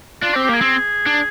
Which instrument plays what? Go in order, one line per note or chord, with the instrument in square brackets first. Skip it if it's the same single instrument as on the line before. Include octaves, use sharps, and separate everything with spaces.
[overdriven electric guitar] D4 [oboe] F4
[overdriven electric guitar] C4 [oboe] G4
[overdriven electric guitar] A#3 [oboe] G4
[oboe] G#4
[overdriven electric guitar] C4
D4